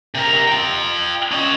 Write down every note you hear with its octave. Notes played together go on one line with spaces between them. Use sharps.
C3 A#4
F4 G5
C#4 D#5